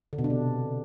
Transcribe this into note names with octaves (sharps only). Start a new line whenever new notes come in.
D3
B2
D4
C3